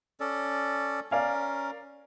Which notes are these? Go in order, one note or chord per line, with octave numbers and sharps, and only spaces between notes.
C#4 A4 D5
C#4 A#4 D5 F5 G#5